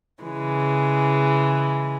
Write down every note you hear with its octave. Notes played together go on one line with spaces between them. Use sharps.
C#3 E3 G#3